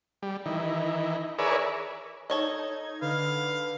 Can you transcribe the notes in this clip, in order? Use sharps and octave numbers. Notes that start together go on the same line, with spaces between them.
G3
D#3 E3
G#4 A#4 B4 C#5 D5 E5
D#4 A4 C#5 D#5 G#6
D3 B4 F5